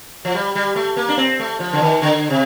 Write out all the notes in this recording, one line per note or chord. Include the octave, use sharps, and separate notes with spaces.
F3
G3
G3
A3
A#3
D4
C4
A3
F3
D3
D#3
D3
C3